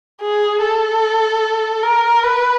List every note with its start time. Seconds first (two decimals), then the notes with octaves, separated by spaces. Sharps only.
0.21 G#4
0.61 A4
1.83 A#4
2.23 B4